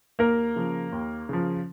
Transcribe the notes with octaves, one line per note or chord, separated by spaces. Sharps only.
D#2 A#3 A#4
C#3 F3
D#2
C#3 F3